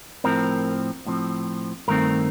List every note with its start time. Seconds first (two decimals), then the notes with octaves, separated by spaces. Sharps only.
0.24 A2 F3 C4 A#4
1.06 A2 F3 C4
1.88 G2 D#3 A3 C4 A#4